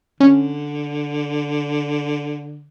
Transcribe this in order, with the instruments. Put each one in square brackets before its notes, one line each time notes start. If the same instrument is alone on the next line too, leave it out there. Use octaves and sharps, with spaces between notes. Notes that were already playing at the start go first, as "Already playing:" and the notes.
[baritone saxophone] D3 [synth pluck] C#4